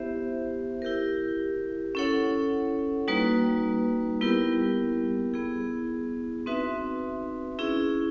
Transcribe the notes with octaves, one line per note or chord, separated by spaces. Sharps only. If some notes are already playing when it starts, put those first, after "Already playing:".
Already playing: B3 E4 G4 C5 E5
E4 G4 A#4
C#4 E4 A4 C#5 F#5
G3 A#3 D#4 F#4 B4
G3 B3 E4 G4 A#4
B3 E4 G#4
C4 D#4 F#4 B4 E5
C#4 E4 G#4